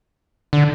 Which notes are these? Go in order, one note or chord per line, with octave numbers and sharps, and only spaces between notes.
D3